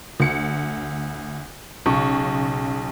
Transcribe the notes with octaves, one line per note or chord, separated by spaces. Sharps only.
D2 C#7
B1 C#3 C#6